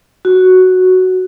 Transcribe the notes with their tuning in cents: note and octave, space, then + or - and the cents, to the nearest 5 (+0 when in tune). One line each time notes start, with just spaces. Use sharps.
F#4 +0